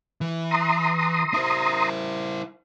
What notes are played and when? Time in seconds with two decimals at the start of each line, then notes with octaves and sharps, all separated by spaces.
0.21 E3
0.51 A#5 C6 D#6
1.34 E4 C5